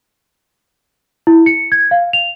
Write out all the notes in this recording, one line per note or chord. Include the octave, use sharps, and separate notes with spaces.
E4
C#7
G#6
F5
F7